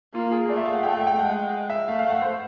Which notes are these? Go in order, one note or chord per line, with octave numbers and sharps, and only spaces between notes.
A#3 F4
G#4
A3 D5
E5
F5
F#5
A3 G5
G5
G5
G#3 F#5
E5
A3 F5
F5
F#5
C5